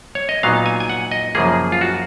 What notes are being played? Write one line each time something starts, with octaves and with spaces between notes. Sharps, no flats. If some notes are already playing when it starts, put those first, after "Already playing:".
C#5
D#5
A#2 F#3 B3 D#4 F5
G#5
G#5
F#5
D#5
F#2 C#3 F3 A#3 G#4
F4
F#4